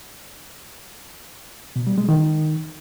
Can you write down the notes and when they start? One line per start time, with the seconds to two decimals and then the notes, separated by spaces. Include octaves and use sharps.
1.76 B2
1.87 G3
1.98 G#3
2.09 D#3